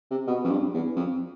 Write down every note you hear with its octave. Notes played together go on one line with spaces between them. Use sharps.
C3
B2
F2
G2
E2
F2